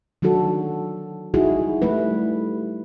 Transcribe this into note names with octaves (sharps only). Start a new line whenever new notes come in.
D#3 F#3 D4 F#4 A4
G3 D#4 E4 F#4 G#4
G3 A3 E4 B4